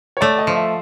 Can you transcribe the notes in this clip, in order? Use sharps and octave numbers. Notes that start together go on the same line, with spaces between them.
C#5
A3 D5
D#5
F3
E5